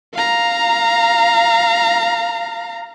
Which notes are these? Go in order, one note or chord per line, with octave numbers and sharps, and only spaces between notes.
F5 A#5